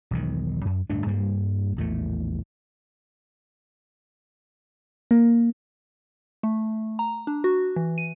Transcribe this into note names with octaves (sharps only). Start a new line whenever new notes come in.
E1 B1 D#3
F#2
D1 G2 A3 D4
G2 G3 A#3
A#1 E2 A2 A3
A#3
A3
A#5
D4
F#4
E3
D#7